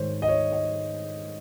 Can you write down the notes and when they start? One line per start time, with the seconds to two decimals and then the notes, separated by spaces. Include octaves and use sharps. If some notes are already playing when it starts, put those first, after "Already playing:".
Already playing: G#2 D#3 G#3 C5 C#5
0.22 D#5
0.29 C#5
0.52 D#5